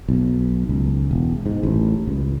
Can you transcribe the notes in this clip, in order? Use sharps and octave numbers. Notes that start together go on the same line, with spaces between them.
B1
C#2
E1
G#2
A1
C#2